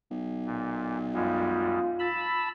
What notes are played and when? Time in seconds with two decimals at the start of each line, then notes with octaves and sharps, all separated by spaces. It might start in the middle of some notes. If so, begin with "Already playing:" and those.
0.11 B1
0.45 A#2
1.14 F#2 G3 G#3 F4
2.00 A5 B5 E6